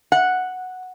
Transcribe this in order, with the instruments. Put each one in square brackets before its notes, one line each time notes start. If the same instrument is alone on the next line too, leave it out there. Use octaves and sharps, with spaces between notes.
[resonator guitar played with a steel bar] F#5